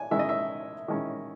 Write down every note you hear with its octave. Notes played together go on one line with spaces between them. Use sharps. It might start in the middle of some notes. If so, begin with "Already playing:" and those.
Already playing: G#5
D#3 G#3 C#4 E4 E5
D#5
E5
D#3 G#3 C#4 E4